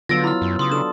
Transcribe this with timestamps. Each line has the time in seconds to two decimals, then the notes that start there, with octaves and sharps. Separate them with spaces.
0.09 D3 F#3 B3 F4 E6 A6 A#6 D7
0.24 E4 B5 F6
0.42 F#2
0.59 C#3 C6 D#6
0.72 D4 A4 E7